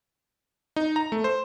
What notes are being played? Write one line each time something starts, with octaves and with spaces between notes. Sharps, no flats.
D#4
A#5
A3
C5